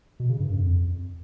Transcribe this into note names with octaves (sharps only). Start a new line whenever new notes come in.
B2
C#3
G2
F#2
F2